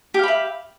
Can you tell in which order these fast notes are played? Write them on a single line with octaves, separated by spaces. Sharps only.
G4 F5 B5 E5